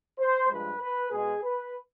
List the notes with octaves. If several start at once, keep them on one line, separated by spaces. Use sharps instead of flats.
C5
G2 F3 G#3 B4
B4
B2 G#3 B3 G#4
B4